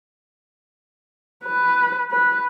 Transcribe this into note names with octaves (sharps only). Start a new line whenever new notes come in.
B4
B4